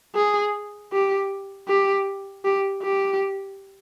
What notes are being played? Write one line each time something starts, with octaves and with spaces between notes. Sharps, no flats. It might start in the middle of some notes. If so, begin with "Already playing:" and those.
G#4
G4
G4
G4
G4